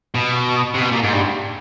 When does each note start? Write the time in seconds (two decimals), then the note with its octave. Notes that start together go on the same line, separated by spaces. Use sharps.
0.15 B2
0.75 C3
0.81 B2
0.92 A#2
1.03 G#2
1.13 G2